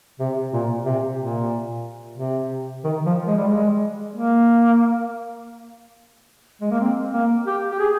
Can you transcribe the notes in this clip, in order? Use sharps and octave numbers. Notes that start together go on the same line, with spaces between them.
C3
A#2
C3
A#2
C3
D#3
F3
G#3
G3
G#3
A#3
G#3
A#3
C4
A#3
G4
G4
G#4